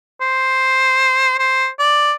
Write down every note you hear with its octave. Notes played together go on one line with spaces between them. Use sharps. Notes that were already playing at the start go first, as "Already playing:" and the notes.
C5
C5
D5